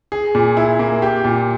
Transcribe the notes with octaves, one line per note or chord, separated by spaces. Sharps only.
G#4
A#2
E4
A#3
G4
A#2